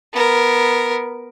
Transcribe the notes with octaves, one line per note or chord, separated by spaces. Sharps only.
B3 A#4